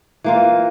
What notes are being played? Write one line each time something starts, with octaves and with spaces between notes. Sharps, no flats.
E3 A#3 F4